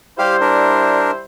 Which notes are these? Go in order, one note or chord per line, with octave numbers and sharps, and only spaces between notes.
G3 E4 G4 C5 F5
D4 A#4